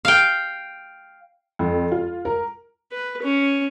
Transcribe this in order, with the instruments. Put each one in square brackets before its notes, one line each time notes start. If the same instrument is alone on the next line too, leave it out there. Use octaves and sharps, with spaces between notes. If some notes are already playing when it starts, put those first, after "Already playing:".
[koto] F5 G5
[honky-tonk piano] F2
F4
A#4
[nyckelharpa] B4
C#4